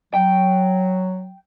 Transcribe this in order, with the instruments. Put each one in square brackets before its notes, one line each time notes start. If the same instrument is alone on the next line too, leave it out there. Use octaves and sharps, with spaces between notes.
[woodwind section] F#3 [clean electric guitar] G5